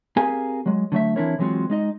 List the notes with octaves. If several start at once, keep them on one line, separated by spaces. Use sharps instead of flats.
C4 G4 G#4 A#4 F5 G#5
F#3 G#3
D3 F#3 A3 E5
E3 C4 D4 E4 A#4 C#5
E3 F#3 G#3 C4 F4 F#4
G#3 D#4 D#5